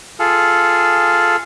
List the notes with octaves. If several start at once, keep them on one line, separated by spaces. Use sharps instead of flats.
F4 G#4 A4